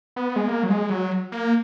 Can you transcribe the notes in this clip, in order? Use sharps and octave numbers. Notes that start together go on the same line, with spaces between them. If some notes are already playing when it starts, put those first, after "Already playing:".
B3
G#3
A#3
F#3
G#3
F#3
A#3